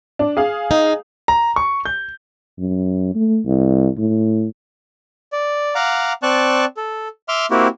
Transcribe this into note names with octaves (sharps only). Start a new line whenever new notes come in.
D4
G#4 F5
D#4
A#5
C#6
G6
F#2
A3
C2
A2
D5
F5 F#5 A#5 D6
C4 D5 A5 C#6 F#6
A4
E5 C6 D6 F6
A#3 C4 E4 F#4 G4